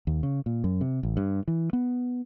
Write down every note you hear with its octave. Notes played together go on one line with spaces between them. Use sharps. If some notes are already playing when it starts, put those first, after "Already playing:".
D#2
C#3
A#2
F#2
C3
A1
G2
E3
B3